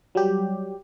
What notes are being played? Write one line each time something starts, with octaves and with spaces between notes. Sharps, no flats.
F#3 G3 G4